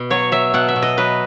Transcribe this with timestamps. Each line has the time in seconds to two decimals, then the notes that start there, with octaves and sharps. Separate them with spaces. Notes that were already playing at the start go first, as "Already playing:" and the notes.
Already playing: B2
0.10 F#3 C#5
0.32 F#3 E5
0.54 B2 F#5
0.69 E5
0.76 B2
0.82 D#5
0.97 F#3 B4